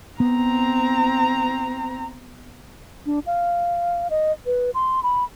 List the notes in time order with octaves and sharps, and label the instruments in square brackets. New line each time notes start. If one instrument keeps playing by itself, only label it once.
[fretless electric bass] B3 [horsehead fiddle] C4 A#5
[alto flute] D4
F5
D#5
B4
C6
B5